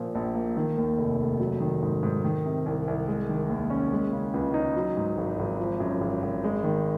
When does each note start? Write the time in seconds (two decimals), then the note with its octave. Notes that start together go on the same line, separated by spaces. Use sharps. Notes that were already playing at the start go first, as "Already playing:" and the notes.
Already playing: A#2 F3
0.15 A#1
0.35 A#3
0.57 D#3
0.77 D#2
0.98 F1
1.20 F1
1.39 F#3
1.60 D#3
1.83 G#2
2.03 G#2
2.24 D#3
2.45 C3
2.66 C2
2.87 C2
3.08 G#3
3.29 D#3
3.49 D#2
3.70 C#4
3.92 G#3
4.12 C#3
4.34 C#2
4.54 D#4
4.76 F#3
4.97 G#2
5.17 G#1
5.39 G#1
5.60 F3
5.80 F#2
6.01 G#1
6.23 G#1
6.44 G#3
6.64 D#3